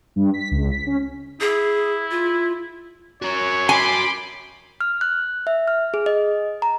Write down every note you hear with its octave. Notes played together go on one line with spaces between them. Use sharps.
G2
B6
C#2
B6
C#4
E4 G#4
F4
F#4 A#4 C#5
G#5 B5 C6 D6
F6
F#6
E5
F6
G#4
D#5
A#5